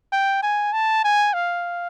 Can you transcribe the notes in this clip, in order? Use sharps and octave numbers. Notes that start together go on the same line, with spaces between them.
G5
G#5
A5
G#5
F5